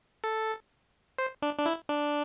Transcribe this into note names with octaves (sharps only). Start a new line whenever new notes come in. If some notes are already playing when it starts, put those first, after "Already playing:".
A4
C5
D4
D4
E4
D4